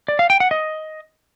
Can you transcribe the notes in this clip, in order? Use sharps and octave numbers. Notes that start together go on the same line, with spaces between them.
D5
F5
G5
F#5
D#5